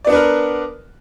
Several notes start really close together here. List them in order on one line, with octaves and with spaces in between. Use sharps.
D5 B3 D4 B4 A#4